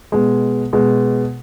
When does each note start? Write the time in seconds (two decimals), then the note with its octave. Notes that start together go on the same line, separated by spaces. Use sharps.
0.12 B2 G#3
0.73 B2 G#3